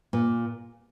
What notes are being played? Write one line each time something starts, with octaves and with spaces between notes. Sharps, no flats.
A#2